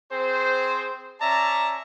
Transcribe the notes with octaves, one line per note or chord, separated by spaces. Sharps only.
C4 G#4 C5
C#4 D5 E5 A5 A#5